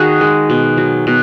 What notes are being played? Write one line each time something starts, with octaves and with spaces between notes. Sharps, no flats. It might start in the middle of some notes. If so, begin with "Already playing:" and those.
Already playing: D#3 F#4 G#4
G#3
B2
F#3
B2